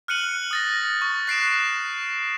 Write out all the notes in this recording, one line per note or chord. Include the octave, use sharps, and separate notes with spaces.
F6 F#6 C#7 D#7 F#7
D#6 A6 A#6
C#6
F#6 C7 D7 E7